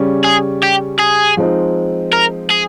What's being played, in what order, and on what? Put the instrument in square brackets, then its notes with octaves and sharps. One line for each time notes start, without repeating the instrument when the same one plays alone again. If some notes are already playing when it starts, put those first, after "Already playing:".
Already playing: [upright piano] C#3 G3 C#4
[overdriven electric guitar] G#4
G4
G#4
[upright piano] F3 G#3 C4 D#4
[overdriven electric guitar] A#4
G#4